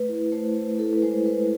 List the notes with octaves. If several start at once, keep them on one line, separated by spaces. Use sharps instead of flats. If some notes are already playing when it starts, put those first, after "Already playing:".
Already playing: A3 B4
E4
A3 C5
A3
E4 A4
B4
G#3 C5
G#3 B4